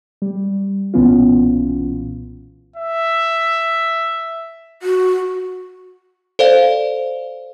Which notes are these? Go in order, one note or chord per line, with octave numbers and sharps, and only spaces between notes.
G3
B1 A#2 E3 B3 C#4 F4
E5
F#4
A4 C5 D5 F5